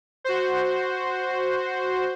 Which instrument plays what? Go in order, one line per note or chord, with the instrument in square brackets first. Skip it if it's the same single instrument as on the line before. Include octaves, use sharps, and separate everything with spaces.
[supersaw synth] F#4 C5